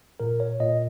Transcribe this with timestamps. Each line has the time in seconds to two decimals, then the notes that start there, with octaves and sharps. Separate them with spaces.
0.20 A#2 A#4
0.40 C#5
0.60 A#2 D#5